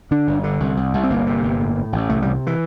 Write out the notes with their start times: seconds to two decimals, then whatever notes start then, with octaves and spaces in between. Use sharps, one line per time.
0.11 D3 D4
0.27 G1
0.44 D3
0.60 C2
0.77 C2
0.94 C2
1.03 C4
1.10 G1 A#3
1.27 C3
1.43 G1
1.60 A2
1.76 A2
1.92 A1
2.09 C2 A3
2.22 G3
2.26 C3
2.47 E3